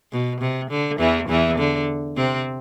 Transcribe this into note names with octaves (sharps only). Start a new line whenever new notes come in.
B2
C3
D3
E2 E3
E2 E3
D3
C3 C4